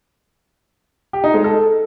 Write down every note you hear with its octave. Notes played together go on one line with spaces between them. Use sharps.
G4
D#4
G#3
A4